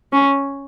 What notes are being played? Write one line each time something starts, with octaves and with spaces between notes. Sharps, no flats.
C#4